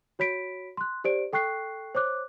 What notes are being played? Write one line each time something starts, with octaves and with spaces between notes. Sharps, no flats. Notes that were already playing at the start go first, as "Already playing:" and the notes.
F#4 C#5 B5 B6 D7
C6 F#6
G4 C5 D5 D7
A4 G5 C#6 F#6 C7
C5 C#5 D6 F#6